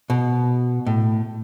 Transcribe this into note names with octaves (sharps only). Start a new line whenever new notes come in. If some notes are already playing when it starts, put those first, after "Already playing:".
B2
A2